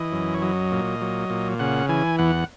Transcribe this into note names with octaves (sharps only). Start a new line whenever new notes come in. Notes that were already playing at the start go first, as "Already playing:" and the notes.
Already playing: E3 D#5
F#2
C#5
F#3 D#5
A#2
F#3
A#2
C#3 F#5
E3 G#5
E2 F#5